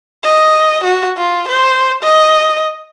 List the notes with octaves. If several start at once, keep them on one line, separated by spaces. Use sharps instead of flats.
D#5
F#4
F4
C5
D#5